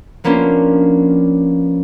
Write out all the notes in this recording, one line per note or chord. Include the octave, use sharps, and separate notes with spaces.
F3 A#3 B3 C#4 D4 F4